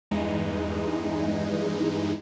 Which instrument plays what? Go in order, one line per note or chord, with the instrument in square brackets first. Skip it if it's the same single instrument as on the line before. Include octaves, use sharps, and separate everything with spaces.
[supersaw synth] E2 G2 E3 G#3 D#4